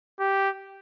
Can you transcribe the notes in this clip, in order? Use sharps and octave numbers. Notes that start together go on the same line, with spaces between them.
G4